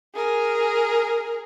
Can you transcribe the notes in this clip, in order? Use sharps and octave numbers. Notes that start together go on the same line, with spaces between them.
G#4 A#4